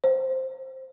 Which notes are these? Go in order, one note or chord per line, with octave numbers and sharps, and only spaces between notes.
C5